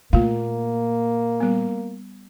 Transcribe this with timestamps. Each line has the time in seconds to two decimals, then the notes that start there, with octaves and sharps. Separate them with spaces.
0.13 A#2 A3 A#3 F4 F5
1.40 G3 B3